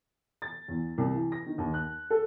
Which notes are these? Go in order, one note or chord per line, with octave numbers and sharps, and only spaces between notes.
A6
E2
C2
E3
A#6
D#3
D#2
F#6
A4